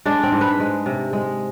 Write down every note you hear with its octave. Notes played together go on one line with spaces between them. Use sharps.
G#3 D4
C4
G#2
B4
G#3
C3
G#3